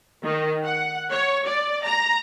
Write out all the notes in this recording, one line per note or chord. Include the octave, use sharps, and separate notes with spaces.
D#3
F#5
C#5
D5
A#5